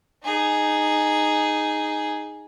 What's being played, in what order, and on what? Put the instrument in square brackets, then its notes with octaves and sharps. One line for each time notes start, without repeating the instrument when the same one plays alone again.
[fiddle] D#4 G#4